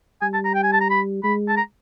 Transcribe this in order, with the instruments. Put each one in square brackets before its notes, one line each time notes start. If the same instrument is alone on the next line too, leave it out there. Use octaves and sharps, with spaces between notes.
[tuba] G3 [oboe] G#5
[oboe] A5
A#5
G5
G#5
A5
A#5
B5
[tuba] G#3 [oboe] B5
[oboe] A5
A#5